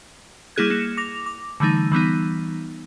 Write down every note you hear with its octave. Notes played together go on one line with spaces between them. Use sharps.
G3 A#3 E4 G#4 F#6 G#6
A#3 C#7 E7
D6 A#6 F7
D6
D3 E3 G3 A3 D#4
E3 G3 B3 D#4